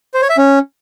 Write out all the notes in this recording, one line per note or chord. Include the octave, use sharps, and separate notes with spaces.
C5
C#5
E5
C#4